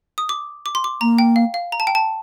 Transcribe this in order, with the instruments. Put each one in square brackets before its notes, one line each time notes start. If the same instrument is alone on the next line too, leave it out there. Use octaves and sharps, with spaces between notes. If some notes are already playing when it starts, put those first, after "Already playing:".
[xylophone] D#6
D6
D6
C6
D6
[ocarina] A#3 [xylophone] A#5
[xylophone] G5
F5
F5
A#5
A5
G5
A5